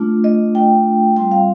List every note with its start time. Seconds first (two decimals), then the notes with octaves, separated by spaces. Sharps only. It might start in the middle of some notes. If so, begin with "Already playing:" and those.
Already playing: A3 D4 F4
0.24 D#5
0.55 G5
1.16 G3 C4 F4 G5
1.31 F5